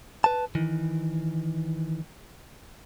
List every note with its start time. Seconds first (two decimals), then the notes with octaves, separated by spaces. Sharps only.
0.24 B4 A5
0.55 D#3 E3